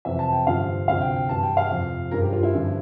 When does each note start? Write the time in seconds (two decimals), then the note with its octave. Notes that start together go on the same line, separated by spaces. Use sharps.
0.05 F2 C3 E3 E5
0.19 A5
0.32 G5
0.46 G2 D3 F3 F5
0.88 D2 C3 F3 F5
1.01 G5
1.16 G5
1.29 G2 E3 A5
1.43 G5
1.57 F5
1.70 F2 C3 F3
2.11 G2 F3 A#4
2.22 G4
2.33 F4
2.43 E4
2.54 G2 D3 F3